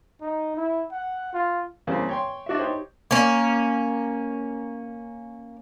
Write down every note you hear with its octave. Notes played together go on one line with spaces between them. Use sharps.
D#4
E4
F#5
F4
E2 C#3 G3 A#3 C4
C#5 G5 C6
D4 F#4 D#5 E5
D#4 G4 C5 C#5
A#3 C#4